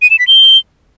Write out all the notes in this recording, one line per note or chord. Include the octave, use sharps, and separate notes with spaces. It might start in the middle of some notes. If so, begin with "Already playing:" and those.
D#7
E7
B6
G7